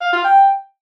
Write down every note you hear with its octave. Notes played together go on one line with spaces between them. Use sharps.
F5
F4
G5